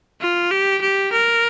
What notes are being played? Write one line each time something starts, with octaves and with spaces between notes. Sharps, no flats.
F4
G4
G4
A#4